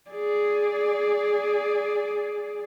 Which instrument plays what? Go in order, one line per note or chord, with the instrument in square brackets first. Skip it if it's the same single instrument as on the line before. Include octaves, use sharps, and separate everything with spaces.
[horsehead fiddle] G#4 D5